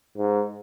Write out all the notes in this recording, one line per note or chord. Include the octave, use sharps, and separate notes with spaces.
G#2